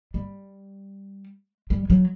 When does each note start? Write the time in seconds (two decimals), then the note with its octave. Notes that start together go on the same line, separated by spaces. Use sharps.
0.14 G3
1.70 G3
1.90 F#3